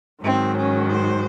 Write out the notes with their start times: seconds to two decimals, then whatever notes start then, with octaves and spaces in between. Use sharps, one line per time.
0.22 G#2 D#3 F#3 C4
0.56 C#4
0.90 C5